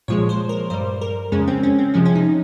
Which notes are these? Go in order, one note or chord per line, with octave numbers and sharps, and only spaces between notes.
A#2 F3 G#3 C#5
C5
A#4
G2 G3 C5
A#4
F2 C#3 G#3 C#4
C4
C#4
C4
C3 F3 G#3 C#4
C#4
D#4